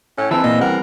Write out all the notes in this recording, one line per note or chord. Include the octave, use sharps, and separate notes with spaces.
A2 C#4
E3 C4 E5 A5
A#2 D#5
G3 A#4 F#5 A#5